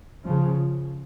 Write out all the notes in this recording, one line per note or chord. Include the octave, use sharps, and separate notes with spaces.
C#3 F3